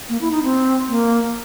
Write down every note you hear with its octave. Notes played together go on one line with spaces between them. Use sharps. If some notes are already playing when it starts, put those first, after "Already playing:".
A#3
E4
D#4
C4
A#3